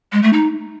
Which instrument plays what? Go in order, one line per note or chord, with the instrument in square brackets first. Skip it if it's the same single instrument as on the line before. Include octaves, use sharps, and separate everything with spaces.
[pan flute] G#3
A3
D#4